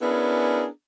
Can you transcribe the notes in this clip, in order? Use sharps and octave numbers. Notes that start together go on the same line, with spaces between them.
B3 C#4 D4 E4 G#4 A#4